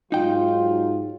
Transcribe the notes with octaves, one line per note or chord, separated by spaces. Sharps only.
G#2 F#3 D#4 F4 G5